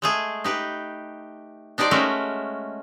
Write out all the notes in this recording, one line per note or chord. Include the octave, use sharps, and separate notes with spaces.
G#3 A3 G#4
D#4 G4 B4
D4 D#4 G4 C5 D5
G#3 A3 C#4 F#4 A#4 E5